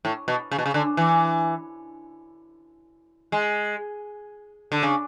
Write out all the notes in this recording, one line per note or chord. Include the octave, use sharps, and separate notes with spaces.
A2
B2
C#3
B2
C#3
D3
E3
G#3
D3
C#3